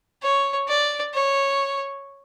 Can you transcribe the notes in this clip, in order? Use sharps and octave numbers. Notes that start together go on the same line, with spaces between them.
C#5
D5
C#5